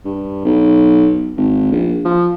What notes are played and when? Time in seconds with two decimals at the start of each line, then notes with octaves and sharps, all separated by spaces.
0.05 G2
0.45 B1
1.37 G#1
1.72 A#1
2.05 F3